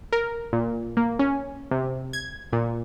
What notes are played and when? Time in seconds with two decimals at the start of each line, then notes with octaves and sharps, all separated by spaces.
0.13 A#4
0.53 A#2
0.97 A#3
1.19 C#4
1.71 C3
2.13 G#6
2.53 A#2